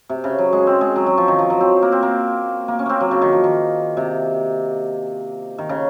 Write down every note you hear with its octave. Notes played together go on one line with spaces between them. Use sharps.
C3
C#3
F#3
G#3
C4
G#3
F#3
F#3
F3
D#3
F3
F#3
C4
A#3
C4
A#3
A#3
C#4
A#3 C4
F#3
C#3
D#3
F3
D#3
C3
D#3
C#3